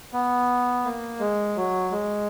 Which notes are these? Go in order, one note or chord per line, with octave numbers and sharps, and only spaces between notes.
B3
A#3
G#3
F#3
G#3